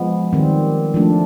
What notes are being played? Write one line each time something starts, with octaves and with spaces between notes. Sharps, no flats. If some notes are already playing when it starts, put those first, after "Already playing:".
Already playing: F3 G#3 B3
D#3 G3 C4
F3 A3 D4